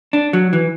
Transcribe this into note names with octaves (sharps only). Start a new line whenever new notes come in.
D4
F#3
E3